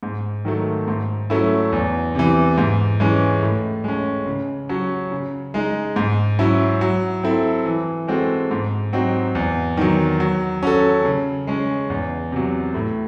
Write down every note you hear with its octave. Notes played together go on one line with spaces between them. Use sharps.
G#2
D#3 F#3 A3
G#2
F#3 A3 C#4 E4
E2
C3 E3
G#2
E3 G#3 C#4
A2
G#3 C#4
C#3
F#3 C#4
C#3
G#3 D#4
G#2
F#3 C#4 E4
F#3
C4 E4 A4
E3
G#3 C4 F#4 A4
G#2
F#3 C4 D#4 F#4
E2
D#3 F#3
F#3
C#4 F#4 A4
C#3
G#3 C#4
E2
C3 F#3
A2